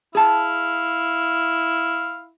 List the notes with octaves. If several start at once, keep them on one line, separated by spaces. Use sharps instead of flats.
E4 G#4 F5 A5